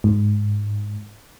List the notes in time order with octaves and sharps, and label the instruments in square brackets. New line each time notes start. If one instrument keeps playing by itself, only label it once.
[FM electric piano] G#2